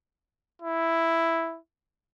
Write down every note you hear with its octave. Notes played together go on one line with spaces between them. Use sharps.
E4